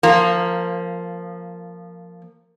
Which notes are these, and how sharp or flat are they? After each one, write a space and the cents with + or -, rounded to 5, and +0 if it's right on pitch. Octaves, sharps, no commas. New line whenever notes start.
F3 +0 A#3 -15